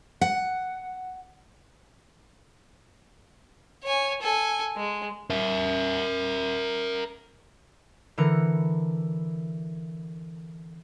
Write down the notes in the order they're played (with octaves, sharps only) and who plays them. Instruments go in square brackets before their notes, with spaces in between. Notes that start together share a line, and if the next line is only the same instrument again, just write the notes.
[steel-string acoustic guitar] F#5
[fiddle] C#5 G#5
A4 G#5
G#3
[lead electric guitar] A#4 E5
[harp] D3 E3 A#4 C#7